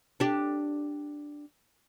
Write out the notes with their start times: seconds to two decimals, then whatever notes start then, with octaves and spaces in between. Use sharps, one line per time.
0.20 D4 G4